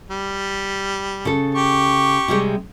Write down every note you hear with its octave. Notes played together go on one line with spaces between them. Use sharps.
G3
C#3 A4
G4 C#6
C3 G3 G#3